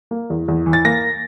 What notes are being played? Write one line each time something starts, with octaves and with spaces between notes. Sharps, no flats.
A#3
E2
E2
E3
A6
A#3 A#6